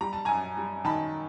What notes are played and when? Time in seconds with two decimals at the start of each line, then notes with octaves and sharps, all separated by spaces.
0.01 G3 A#5
0.13 A5
0.25 F#2 G#5 A#5
0.57 G3
0.85 D#3 A5 B5